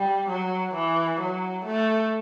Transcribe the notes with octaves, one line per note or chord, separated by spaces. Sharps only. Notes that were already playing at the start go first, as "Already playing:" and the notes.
Already playing: G3
F#3
E3
F#3
A3